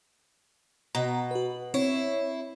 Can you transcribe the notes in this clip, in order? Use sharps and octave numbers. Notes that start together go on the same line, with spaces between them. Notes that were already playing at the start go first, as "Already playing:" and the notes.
B2 A#5
F#4 B4
C4 E4 C#5